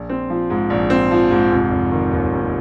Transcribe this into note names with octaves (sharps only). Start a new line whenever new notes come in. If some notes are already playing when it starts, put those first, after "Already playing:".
Already playing: A#1
C4
F3
G#2
A#1
C4
F3
G#2
F1
F1
D#3
D#2
F1